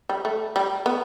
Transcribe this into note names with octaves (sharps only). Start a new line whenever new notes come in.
G3
A3
G3
B3